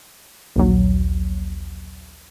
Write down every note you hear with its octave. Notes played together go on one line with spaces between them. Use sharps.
A#1 D#2 F#3